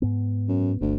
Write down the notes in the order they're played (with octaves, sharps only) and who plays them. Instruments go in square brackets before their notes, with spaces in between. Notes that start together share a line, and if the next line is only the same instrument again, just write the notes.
[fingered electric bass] G#2 B3
[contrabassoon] F#2
[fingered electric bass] G1 [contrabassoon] D2